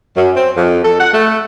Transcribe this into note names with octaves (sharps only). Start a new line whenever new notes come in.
F#2
C4
F2
A4
F#5
A3